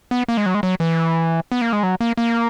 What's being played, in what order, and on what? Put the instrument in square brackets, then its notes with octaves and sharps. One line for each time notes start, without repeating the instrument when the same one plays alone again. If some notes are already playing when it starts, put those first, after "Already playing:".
[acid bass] B3
A#3
G#3
F#3
G#3
F#3
E3
B3
A#3
G#3
F#3
A#3
A#3